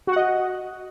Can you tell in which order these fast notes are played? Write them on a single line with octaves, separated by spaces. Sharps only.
F#4 F#5 D#5